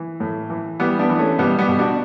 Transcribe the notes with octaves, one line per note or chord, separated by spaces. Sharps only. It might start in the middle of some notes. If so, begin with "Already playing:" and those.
Already playing: E3
A2
E3
E3 G3 B3
B3 D4
E3
A3 C#4
B2 G3 B3
G3 B3
B2
D4 F#4